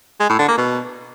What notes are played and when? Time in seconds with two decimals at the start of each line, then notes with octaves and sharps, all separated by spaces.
0.20 G#3
0.29 A2
0.39 D3
0.48 A#3
0.58 B2